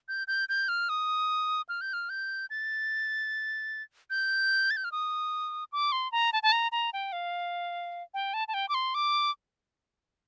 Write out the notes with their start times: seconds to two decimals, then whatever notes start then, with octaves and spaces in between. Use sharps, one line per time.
0.08 G6
0.28 G6
0.49 G6
0.68 F6
0.89 D#6
1.69 F6
1.81 G6
1.93 F6
2.10 G6
2.50 A6
4.10 G6
4.71 A6
4.77 G6
4.84 F6
4.92 D#6
5.72 D6
5.92 C6
6.12 A#5
6.33 A5
6.43 A5
6.52 A#5
6.72 A#5
6.93 G5
7.12 F5
8.14 G5
8.34 A5
8.48 A5
8.54 G5
8.69 D6
8.74 C6
8.95 D6